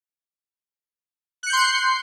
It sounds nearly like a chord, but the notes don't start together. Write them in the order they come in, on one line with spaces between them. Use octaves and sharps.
F#6 C#7 G6 C6 C7